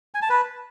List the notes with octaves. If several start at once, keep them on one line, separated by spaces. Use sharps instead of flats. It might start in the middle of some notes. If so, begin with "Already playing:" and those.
G#5
A5
B4